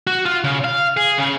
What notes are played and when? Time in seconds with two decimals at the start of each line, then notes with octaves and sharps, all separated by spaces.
0.07 F#4
0.25 F4
0.44 C#3
0.64 F5
0.97 G#4
1.18 C#3